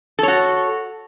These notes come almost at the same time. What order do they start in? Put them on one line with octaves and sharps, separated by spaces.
A4 C#5 F#4